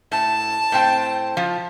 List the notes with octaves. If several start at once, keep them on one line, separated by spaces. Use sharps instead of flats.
A2 A5
A2 C4 G5
F3 F4